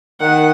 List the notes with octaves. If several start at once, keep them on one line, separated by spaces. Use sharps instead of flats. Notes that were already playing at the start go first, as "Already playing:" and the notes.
D#3 F#5